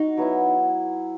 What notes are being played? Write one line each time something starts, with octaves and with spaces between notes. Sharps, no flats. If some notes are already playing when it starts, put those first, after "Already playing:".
Already playing: D#4 F#4
F#3 B3 E4